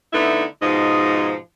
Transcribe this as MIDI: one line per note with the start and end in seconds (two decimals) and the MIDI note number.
0.13 0.44 50
0.13 0.44 57
0.13 0.44 59
0.13 0.44 63
0.13 0.44 64
0.62 1.36 44
0.62 1.36 47
0.62 1.36 53
0.62 1.36 63
0.62 1.36 75